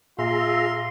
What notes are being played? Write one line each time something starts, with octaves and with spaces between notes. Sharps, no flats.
A#2 F4 G#4 E5 A#5 C6